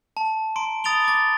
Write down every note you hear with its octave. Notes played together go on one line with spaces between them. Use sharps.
A5
A#5 C6 D7
B5 D#6 A6 D7 F7 G7
D6 A6